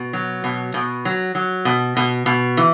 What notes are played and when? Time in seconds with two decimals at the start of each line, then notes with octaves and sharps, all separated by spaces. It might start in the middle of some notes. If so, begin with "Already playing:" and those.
Already playing: B2
0.13 F#3
0.44 B2
0.74 B2
1.05 F#3
1.35 F#3
1.65 B2
1.97 B2
2.26 B2
2.57 E3